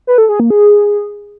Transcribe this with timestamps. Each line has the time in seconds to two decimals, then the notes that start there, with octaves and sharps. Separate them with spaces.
0.07 B4
0.18 A4
0.29 G#4
0.40 A#3
0.50 G#4